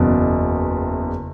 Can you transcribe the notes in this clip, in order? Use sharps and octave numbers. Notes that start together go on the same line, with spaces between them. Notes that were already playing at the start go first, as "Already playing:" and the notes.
Already playing: F#1 E2 B2